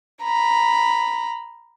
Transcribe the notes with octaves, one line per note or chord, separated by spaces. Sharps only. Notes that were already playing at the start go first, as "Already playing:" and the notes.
A#5 B5